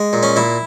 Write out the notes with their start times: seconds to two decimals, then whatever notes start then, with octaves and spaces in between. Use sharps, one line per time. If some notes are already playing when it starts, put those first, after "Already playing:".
Already playing: G#3
0.13 A#2
0.23 C#4
0.36 A#2 E4